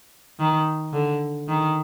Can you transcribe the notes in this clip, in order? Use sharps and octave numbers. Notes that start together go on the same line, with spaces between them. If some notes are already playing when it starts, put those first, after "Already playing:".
D#3
D3
D#3